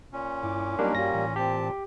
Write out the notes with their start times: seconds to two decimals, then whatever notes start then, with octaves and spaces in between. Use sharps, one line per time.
0.13 A#2 C#4
0.43 G2 E4 D6
0.79 F#3 G3 A#3 B3 D4 D#4 A#4
0.95 G2 G3 A#3 F#4 A#6
1.14 A2 E3
1.36 A#2 C4 G4 A5